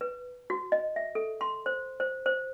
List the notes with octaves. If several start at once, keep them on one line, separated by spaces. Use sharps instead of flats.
B4
F#4
D#5
E5
A4
C6
C5
C5
C5